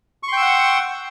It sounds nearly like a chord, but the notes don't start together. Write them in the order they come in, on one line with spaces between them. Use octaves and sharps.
C#6 C6 G5 E6 F#5